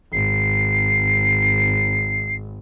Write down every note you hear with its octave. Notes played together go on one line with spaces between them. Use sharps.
G#1 C7